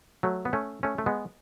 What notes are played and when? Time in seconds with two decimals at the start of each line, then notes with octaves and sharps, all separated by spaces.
0.23 F#3 A3
0.45 B3
0.53 A3 C#4
0.83 A3 C#4
0.98 A3
1.06 G#3 B3